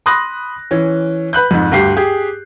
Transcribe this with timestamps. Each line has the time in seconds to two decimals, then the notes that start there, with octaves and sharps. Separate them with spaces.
0.06 B5 C6 D#6 F#6 A#6
0.71 E3 C#4
1.33 B4 B5 F#6 G6
1.51 F2 G#2
1.71 D2 G2 G4 C7
1.96 G4 G#4